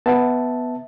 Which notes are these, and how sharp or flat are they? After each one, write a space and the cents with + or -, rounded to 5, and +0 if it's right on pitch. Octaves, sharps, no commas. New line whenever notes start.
B3 +0 E5 -15 A5 +0